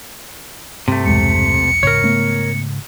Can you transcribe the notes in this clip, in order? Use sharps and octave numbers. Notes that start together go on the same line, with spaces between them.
G2 C3 A3 C4
B1 E2 G#3 C#7
G#2 C#3 A#4 C#5
A3 B3